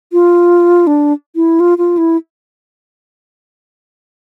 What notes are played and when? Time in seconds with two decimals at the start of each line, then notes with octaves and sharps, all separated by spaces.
0.12 F4
0.87 D4
1.36 E4
1.60 F4
1.78 F4
1.98 E4